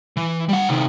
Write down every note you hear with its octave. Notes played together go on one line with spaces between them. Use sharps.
E3
G3 F#5
C3 D#3